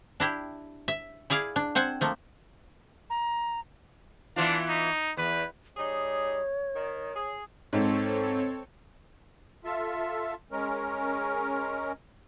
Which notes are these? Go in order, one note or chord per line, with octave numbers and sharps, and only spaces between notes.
D4 E4 G4
E5
E4 G#4 D5 F5
D4
C4 C5 F#5 G#5
F3 A3 A#3
A#5
E3 B3 D4 F4
D#4
E2 B4
G3 D#4 G#4 C#5
D#3
G#4
G#2 C4 A4 C#5
F4 A4 E5
G#3 C#4 A#4